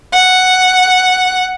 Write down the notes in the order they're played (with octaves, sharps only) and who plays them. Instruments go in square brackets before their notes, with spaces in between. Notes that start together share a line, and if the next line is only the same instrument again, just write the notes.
[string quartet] F#5